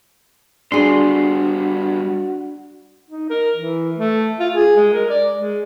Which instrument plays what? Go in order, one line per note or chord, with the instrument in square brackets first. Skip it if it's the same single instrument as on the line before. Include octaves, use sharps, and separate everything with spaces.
[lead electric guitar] G3 B3 [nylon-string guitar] D4 G#4 [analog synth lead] F#4 [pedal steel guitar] C6
[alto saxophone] D#4
A#4
E3
A3
F4
G#4
G#3
A#4
D5
G#3